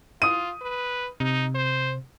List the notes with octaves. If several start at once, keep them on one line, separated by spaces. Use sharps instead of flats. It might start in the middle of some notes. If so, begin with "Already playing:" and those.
F4 D#6 D#7
B4
C3 D#4
C5